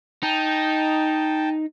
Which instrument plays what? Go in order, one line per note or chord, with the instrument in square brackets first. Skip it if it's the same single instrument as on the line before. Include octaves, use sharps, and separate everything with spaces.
[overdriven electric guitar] D#4 [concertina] G5 A5